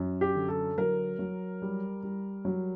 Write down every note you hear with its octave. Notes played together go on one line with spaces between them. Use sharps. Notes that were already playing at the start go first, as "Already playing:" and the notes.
Already playing: F#2
G4
D3
A4
F#3 A#4
F#3
G3
G3
F#3